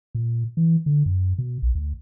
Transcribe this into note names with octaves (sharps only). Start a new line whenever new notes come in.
A#2
E3
D3
F#2
B2
B1
D2